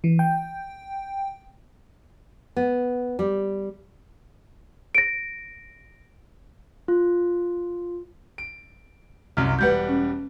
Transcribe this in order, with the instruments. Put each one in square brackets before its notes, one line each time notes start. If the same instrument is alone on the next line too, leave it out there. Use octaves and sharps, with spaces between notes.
[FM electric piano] E3
G5
[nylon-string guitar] B3
G3
[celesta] A#6 D7
[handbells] F4
[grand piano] D7
[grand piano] C2 F#2 [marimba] F6
[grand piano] E1 G3 F#5 [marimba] B4 G6
[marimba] C#4